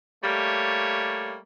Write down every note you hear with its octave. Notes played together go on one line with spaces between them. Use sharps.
G3 A3 A#3 C#5